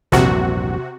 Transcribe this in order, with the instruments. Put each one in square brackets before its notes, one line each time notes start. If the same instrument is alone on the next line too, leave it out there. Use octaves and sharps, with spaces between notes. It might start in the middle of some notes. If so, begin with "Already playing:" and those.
[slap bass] A#1 E2 G2 [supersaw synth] C3 F#4